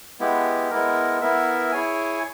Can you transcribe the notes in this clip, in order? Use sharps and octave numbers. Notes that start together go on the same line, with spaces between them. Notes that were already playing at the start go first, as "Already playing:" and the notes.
G#3 B3 E4 G4
G#3 B3 E4 A#4
B3 E4 A#4 E5
E4 G#4 C#5 G#5